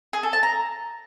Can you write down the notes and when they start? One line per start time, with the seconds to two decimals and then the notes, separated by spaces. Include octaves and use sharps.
0.13 G#4
0.23 A4
0.33 A5
0.43 A#5